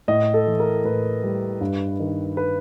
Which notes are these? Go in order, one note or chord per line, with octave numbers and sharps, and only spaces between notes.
A2 D#5
A4
E3
A#4
A2 B4
G3
G2
D#3
B4